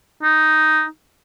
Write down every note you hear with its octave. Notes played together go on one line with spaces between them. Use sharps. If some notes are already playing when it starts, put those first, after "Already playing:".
D#4